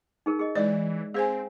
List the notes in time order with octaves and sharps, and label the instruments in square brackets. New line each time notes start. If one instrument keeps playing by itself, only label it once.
[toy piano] D#4 G#4 A#4
G#4 D#5
[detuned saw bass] E3 [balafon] G#3 D#4 D5 [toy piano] C#5 E5
[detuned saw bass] C4 [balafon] G#4 C5 G#5 [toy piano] F5